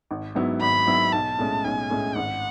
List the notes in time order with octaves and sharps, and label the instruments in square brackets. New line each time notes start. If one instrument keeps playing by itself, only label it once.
[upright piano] G#1
G#2 F#3 B3 E4
[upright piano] G#1 [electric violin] B5
[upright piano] G#2 F#3 B3 E4
[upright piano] B1 [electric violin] A5
[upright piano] A2 G#3 C#4
[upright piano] B1 [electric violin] G#5
[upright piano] A2 G#3 C#4
[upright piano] G#1 [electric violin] F#5